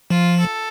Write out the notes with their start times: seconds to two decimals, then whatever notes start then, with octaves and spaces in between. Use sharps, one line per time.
0.10 F3 F4
0.39 A4